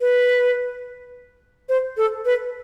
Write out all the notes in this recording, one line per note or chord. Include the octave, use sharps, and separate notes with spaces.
B4
C5
A4
B4